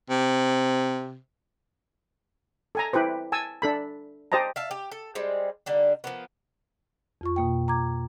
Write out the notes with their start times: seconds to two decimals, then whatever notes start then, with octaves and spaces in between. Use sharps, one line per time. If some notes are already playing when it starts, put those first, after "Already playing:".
0.10 C3
2.75 A4 G#5 A#5
2.93 E4 G4 B4 C5
3.32 G#5 A5 E6
3.62 D4 A4 B5
4.32 G4 C5 D#5 A5 A#5
4.56 E5 F5 A5
4.71 G4
4.91 A4
5.15 G3 G#3 C4
5.66 D3 G3 A#3
6.04 F3 A#3 B3
7.21 F2 F4 C#6
7.36 B2 A#3 G5
7.68 A#5 D6 G#6